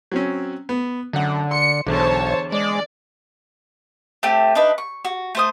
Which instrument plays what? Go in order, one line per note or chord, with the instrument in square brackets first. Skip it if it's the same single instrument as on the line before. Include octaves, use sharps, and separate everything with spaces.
[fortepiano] F#3 C4 C#4
B3
[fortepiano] F#2 F#5 [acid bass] D3
[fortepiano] C6 [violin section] C#7
[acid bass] B1 [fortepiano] E2 D3 [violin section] C5 C#5 A5
[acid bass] G#3 [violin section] D5
[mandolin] A3 C4 G4
D4 D#4 B4
C#6
F#4
A3 C5 D#6